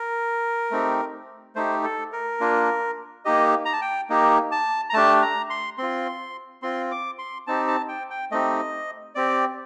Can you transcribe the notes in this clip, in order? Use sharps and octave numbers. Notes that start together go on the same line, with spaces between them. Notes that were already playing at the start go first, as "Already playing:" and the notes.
Already playing: A#4
A3 C4 D#4 G4
A3 D#4 G4 C5
A4
A#4
A#3 D4 F4
A#3 D#4 G4 D#5
A#5
A5
G5
A#3 D#4 G4
A5
A#5
A3 D4 G4 A5
A#5
C6
C4 F4 C6
C4 F4 C6
D6
C6
C4 D#4 G4 A5
A5
G5
G5
A3 C4 D#4 G4 D#5
C4 G4 D5